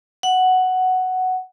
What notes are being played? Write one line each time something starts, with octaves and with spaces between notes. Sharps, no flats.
F#5